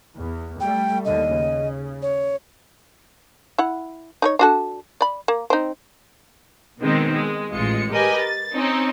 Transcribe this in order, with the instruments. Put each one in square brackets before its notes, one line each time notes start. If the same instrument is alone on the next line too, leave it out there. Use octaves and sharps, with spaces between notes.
[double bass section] E2
[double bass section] G3 A3 [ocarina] G5
[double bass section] D#2 D3 [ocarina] D#5
[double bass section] C#3
[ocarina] C#5
[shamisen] E4 F#5
D#4 A#4 C#5
D4 F#4 A4
D5 B5
A#3
C4 D#4
[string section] B2 D#3 G#3 C4
G#3
A1 G#3 F4 C#7
G4 A#4 B4 D#5 G#5
A6
C4 C#4 D#4